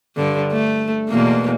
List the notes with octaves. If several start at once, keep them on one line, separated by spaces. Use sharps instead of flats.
G2 D3
A3
E2 B2 A#3